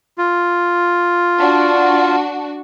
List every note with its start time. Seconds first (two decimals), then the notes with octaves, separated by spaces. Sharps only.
0.18 F4
1.40 D4 F#4